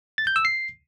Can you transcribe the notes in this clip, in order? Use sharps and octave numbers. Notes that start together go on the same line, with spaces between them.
A6
G6
E6
C7